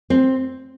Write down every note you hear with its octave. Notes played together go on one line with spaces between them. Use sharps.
C4